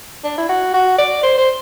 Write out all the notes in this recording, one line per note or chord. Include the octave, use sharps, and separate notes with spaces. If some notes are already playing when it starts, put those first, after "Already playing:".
D4
E4
F#4
F#4
D5
C5
C5